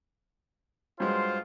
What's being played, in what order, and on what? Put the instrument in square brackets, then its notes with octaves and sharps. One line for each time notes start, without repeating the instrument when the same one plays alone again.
[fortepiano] G2 F#3 G#3 [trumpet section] F4 C5